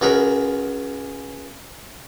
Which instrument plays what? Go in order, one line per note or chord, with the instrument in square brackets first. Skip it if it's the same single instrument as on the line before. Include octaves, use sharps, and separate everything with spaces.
[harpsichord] C#2 F#4 G#4 A#4 B5